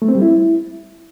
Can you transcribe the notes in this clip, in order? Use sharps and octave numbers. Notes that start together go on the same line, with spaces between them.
A3
C4
G3
E4